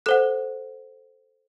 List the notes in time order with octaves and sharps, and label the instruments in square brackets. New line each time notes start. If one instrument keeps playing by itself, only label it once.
[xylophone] A4 C5 F#5 F#6